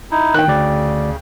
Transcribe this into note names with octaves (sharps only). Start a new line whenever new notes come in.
D#4 E4
D#3 G5 F#6
D2 C#3 D5